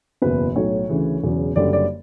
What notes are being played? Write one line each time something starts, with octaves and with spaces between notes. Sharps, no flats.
F#1 E2 B2 B4
B1 A2 F#3 C#5
D2 C#3 E3
E1 E2 C#3 F#3
F#1 F#2 D3 G3 D5
D5